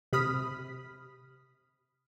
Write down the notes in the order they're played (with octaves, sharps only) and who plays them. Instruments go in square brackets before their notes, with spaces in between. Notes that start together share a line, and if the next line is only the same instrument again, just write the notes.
[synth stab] C3 B5 D#6 F6 B6